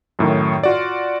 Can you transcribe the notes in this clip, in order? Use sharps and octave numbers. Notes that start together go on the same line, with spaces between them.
F#2 A2 D#3
F4 F#4 D5